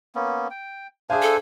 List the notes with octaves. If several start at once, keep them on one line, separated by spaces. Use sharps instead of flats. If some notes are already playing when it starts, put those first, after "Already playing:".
A#3 B3 C#4
G5
D4 G#4 C5 E5 F5 G#5
A4